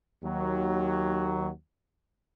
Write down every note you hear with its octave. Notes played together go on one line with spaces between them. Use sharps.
D#2 F#3